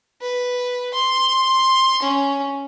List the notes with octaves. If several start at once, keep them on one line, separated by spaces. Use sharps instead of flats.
B4
C6
C#4